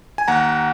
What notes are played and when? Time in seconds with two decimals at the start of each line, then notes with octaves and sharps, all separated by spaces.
0.18 G#5
0.28 D#2 F#5 A#5